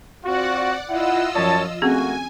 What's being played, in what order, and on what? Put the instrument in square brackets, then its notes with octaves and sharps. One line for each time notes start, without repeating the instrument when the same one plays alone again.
[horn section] C4 F4 F#4 [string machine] D5 F#5
[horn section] E4 F#5 [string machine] F4 D#5 E6
[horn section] F#2 C#5 A5 [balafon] F3 D5
[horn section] A3 A#3 F#4 [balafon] C4 C#4 G#4 [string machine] G#5